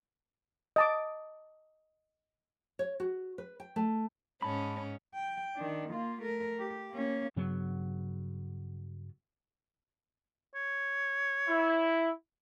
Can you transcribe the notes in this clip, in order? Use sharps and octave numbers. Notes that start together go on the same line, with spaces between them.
D#5 A5 D6
C#5
F#4
B4
G5
A3
G#2 C#4 A5 B5
G5
D#3 D4
A#3 F4
A3 A#4
G4
A#3 C#4
G2 C#3 F#3 B3
C#5
E4